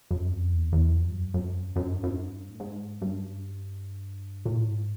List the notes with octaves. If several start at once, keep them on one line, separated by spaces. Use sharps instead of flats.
F#2
F2
E2
E2
F2
G2
F#2
F#2
F#2
G2
F#2
G#2
G2
A2
G#2
G2
A#2
A2
G#2